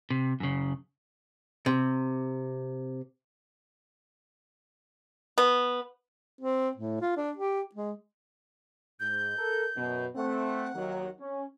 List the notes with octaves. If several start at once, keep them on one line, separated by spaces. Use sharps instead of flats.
C3
F#2 C#3
C3
B3
C4
A2
F4
D4
G4
G#3
G#2 G6
A4 A#4
F#2 B2
A3 C4 F#5
D#2 D#3 F#3
C#4